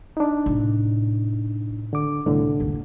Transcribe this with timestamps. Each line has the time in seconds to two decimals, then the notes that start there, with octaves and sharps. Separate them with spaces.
0.17 D4 D#4
0.46 A2 C3
1.93 D3 D6
2.26 C2 A2 D3
2.60 G1 D#2